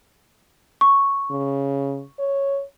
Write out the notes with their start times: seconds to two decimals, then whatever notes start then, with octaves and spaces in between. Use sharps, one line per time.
0.81 C#6
1.31 C#3
2.19 C#5